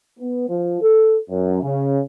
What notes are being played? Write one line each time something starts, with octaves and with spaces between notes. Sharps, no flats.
B3
F3
A4
F#2
C#3